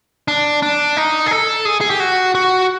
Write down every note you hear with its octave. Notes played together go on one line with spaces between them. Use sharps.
D4
D4
D#4
G#4
A4
G#4
G#4
G4
F#4
F#4